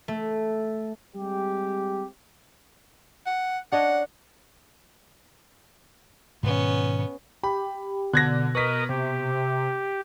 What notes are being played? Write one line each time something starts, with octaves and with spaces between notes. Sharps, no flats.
A3
G3 G#3 C4 G4
F#5
D4 C#5 D#5 F#5
G#2 B2 D#3 B3 C#4
G4 B5
B2 D3 F#6 G#6 A#6
A#4 B4 D#5 C#6 D#6 B6
C3 G4